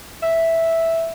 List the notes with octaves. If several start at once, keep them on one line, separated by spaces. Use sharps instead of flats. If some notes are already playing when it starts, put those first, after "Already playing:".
E5